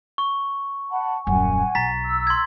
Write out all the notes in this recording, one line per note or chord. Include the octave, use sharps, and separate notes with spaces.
C#6
F#5 A5 B5
D#1 F#2 F#5 G#5
B1 A#5 A6 B6
E6
C6 G#6